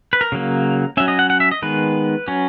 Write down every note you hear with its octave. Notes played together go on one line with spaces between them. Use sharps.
B4
A#4
C#3 F#3 A#3
F#3 C#4 E5
D#5
F#5
F#5
E5
D#5
D#3 G#3 B3 B4
F#3 C#4